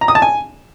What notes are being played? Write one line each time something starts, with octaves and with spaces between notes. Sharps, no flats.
A#5
D#6
A5
G#5